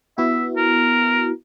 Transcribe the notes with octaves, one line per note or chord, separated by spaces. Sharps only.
B3 E4 F#4 E5
A#4